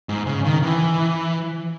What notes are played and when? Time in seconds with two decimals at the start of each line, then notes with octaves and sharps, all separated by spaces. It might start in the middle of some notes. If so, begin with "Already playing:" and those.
0.09 G#2
0.27 C#3
0.44 D#3
0.62 E3